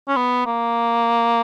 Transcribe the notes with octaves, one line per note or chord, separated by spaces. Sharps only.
C#4
B3
A#3